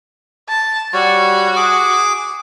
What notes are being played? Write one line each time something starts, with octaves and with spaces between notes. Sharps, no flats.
A5
G3 F#4 C#5
G#4 D6